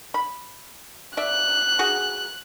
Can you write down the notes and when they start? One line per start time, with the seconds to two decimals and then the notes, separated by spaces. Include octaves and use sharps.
0.14 B5
1.17 D5 E5 F#6
1.79 F#4 G#4